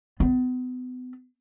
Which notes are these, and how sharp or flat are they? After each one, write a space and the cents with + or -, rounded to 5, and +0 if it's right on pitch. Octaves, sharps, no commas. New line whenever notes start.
B3 +35